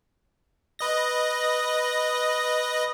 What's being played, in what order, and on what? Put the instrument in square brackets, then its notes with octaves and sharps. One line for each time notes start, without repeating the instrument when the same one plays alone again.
[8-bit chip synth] B4 D#5 A#6